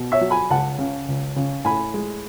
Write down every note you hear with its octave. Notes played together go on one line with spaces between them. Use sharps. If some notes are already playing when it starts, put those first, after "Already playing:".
Already playing: B2
C#5 E5
F#3
G#5 B5
C#2 F#5 A5
C#3
C#2
C#3
A2 G#5 B5
G#3